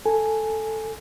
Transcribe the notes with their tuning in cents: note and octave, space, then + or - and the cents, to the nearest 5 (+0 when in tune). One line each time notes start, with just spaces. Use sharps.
A4 +0 G#5 +0